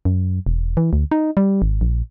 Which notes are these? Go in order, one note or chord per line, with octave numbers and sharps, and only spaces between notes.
F#2
E1
E3
D2
D#4
G3
G#1
A#1